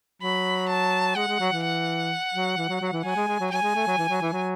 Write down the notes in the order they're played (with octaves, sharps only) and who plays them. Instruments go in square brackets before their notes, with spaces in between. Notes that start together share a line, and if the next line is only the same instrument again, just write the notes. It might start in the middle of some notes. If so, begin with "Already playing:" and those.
[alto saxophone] F#3 [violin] B5
[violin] A5
[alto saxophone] G#3 [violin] F#5
[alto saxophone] G#3
F#3
E3
[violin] F#5
[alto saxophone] F#3
E3
F#3
F#3
E3
[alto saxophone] F#3 [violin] G#5
[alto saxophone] G#3
G#3
F#3
[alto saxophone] F#3 [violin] G#5
[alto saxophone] G#3
A3
F#3
E3
F#3
E3
F#3